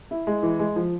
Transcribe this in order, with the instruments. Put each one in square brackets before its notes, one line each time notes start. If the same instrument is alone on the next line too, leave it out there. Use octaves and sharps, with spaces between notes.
[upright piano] E4
G#3
E3
G#3
F3